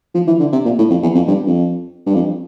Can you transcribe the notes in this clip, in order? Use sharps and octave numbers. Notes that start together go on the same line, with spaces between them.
F3
E3
D3
C3
A#2
A2
F2
E2
F2
G2
F2
G2
F2